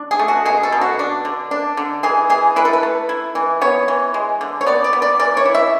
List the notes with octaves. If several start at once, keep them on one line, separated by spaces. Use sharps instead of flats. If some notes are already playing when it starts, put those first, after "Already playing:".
Already playing: D4
G#4
A3
F#4
B2 G#4
A4
B2
F#4
D4
D3
D4
D3
E3 G#4
E3 G#4
E4 B4
A4
B4
A3
E4
E3
B3 C#5
E3
G#3
D3
C#5
B3 D5
D5
B3
D5
E3 D5
C#5
E4
E5